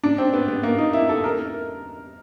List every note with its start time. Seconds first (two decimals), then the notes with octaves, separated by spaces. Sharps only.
0.04 D4
0.18 C4
0.34 B3
0.48 B3
0.63 A#3
0.78 D#4
0.93 E4
1.09 A4
1.24 A#4